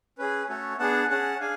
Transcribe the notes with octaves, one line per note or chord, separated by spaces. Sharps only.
C#4 G#4 B4
A3 C#4 F#4 A4 C#5
B3 D4 G#4 F#5 A5
C#4 G#4 F#5 A5
D4 G#4 F5 G#5